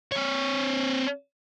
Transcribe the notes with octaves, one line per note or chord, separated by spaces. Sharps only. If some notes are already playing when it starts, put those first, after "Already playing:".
C4 C#5